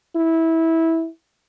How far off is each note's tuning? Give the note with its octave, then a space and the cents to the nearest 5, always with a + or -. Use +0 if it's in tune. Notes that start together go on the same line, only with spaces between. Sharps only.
E4 -15